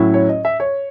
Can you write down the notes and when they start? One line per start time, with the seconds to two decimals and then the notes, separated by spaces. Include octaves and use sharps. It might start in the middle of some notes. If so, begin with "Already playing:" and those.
Already playing: A2 F#3 C#4 E4
0.14 C#5
0.29 D#5
0.45 E5
0.60 C#5